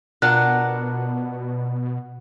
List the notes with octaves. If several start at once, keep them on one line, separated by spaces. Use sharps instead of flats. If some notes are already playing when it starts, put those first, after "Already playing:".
B2 D4 F4 A#4 F#5 F#6